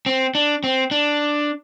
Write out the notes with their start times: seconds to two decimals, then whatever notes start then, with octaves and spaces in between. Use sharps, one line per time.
0.06 C4
0.35 D4
0.64 C4
0.91 D4